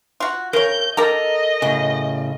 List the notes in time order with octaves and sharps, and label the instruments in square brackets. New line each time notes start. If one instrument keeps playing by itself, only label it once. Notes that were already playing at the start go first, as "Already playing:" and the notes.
[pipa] F4 F#4
[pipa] C#3 C#5 [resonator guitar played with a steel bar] A#4 [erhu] G6
[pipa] A#3 G4 [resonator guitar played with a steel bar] A4 A#4 A#5 [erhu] D#5
[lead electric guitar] A2 C#3 [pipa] F#4